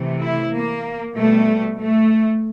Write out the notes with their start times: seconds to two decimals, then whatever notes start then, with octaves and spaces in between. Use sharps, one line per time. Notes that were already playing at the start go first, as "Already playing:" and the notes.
Already playing: C3 E3 A3
0.22 E4
0.54 A#3
1.16 B2 G3 A3
1.79 A3